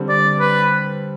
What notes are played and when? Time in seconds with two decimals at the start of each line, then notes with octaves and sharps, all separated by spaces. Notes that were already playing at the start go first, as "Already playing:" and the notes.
Already playing: D3 G3 C4
0.09 D5
0.40 B4